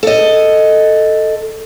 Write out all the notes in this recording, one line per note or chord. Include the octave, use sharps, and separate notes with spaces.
A4 D#5